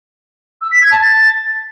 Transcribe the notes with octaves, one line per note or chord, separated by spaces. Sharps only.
E6
B6
G#6
A5
A6